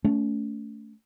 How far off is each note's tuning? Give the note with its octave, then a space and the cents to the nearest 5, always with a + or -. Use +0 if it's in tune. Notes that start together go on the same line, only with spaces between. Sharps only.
A3 +0 C#4 +40